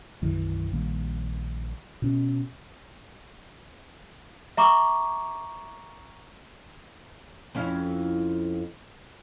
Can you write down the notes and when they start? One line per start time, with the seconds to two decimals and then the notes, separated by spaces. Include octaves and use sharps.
0.22 B1 F#2 D#3 E3
0.72 A#1 D#3 G3 A#3
2.02 B2 C#4
4.57 E5 A#5 C#6 D6
7.55 F2 C#4 E4